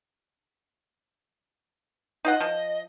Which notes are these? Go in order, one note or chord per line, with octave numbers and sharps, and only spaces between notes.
D#4 F4 D#5 F#5
F3